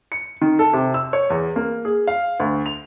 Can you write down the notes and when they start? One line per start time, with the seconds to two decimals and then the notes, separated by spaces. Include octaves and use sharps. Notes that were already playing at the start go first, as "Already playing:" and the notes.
0.12 C#7
0.41 D#3
0.59 A4
0.73 C3
0.94 E6
1.13 C#5
1.30 E2
1.56 A#3
1.85 G#4
2.07 F5
2.40 D2
2.66 F7